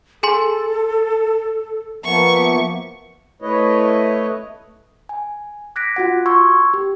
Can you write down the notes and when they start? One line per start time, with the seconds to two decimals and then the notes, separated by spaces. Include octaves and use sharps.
0.23 G#4 A4 G#5 C6
2.05 F3 A#3 B3 E5 C#6
3.42 A3 E4 B4 C#5 D#5
5.09 G#5
5.76 D6 F#6 G#6 A#6 B6 D7
5.96 F4 F#4 F#5
6.26 C6 C#6 E6 G#6
6.74 G4